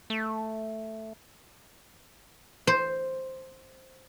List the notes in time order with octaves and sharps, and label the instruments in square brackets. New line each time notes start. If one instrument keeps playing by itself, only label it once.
[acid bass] A3
[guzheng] C5